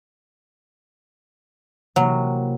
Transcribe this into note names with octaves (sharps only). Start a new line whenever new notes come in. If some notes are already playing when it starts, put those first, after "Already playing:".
C3 E3 F#3 A#3